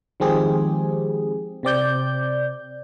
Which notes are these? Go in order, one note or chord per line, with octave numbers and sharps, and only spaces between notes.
D#3 F3 G#3 C4 G4 G#4
C3 C4 D5 G6